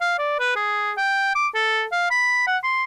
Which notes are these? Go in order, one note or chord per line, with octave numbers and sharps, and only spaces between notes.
F5
D5
B4
G#4
G5
D6
A4
F5
B5
F#5
C6